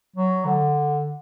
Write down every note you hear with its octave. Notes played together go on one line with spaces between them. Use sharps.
F#3
D3